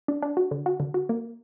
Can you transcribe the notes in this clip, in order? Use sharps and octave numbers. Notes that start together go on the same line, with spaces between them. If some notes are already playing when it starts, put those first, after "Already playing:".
D4
D4
F#4
D3
F#4
D3
F#4
A#3